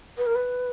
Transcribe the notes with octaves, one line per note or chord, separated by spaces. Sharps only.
B4
A#4
B4